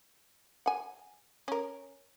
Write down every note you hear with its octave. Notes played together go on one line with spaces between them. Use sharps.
F#5 G#5
C#4 A#4